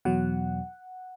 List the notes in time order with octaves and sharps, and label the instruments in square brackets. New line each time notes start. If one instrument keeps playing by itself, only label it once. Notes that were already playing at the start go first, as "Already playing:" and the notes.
[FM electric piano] E2 B2 F#3 F#5